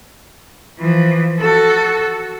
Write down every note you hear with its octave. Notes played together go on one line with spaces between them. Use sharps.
E3 F3
F#4 A4